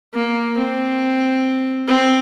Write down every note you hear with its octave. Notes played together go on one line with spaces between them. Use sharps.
A#3
C4
C4